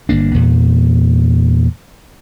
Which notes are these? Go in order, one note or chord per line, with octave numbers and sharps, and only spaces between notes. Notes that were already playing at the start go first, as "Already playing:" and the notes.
G1 A#3 D4
E2 A#2